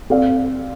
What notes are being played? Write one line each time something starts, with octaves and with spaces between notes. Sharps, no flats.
C4 A4 D5 F5